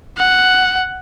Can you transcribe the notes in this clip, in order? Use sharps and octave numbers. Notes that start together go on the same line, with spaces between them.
F#5